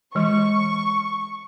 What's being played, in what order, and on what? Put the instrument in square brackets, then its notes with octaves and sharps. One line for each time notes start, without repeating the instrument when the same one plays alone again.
[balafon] E3 G#3 [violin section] C#6